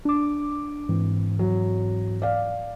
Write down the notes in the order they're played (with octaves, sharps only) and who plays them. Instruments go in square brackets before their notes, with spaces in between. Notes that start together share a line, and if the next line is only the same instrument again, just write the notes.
[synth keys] D4 D6
G#2 E3 C4
[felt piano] F#3
D5 F5